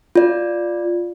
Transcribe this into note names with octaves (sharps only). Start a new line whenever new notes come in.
F4 D5